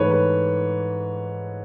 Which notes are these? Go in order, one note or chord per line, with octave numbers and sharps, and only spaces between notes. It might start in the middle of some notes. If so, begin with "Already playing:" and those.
Already playing: G#2 E3 A3 B4 C#5
B4